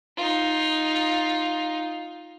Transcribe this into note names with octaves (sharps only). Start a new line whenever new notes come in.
D#4 F4